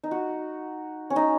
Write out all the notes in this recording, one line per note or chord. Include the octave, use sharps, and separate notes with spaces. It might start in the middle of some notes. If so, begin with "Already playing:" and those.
D#4
F#4
C#4
D#4